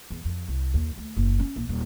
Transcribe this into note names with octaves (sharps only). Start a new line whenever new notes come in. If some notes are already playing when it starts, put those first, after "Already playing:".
E2
F2
C2
D#2
D2
F#1
C#4
A#1
D#1